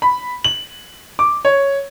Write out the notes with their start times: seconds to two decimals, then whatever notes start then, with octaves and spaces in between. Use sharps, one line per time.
0.02 B5
0.44 F#7
1.19 D6
1.45 C#5